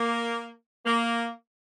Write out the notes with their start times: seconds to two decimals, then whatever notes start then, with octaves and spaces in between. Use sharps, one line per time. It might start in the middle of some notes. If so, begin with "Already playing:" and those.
Already playing: A#3
0.85 A#3